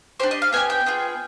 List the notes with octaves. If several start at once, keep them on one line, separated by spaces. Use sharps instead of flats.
D4 G4 C5
D#5
F5
B3 D#4 G4 G#5
G5
B3 F4 G#4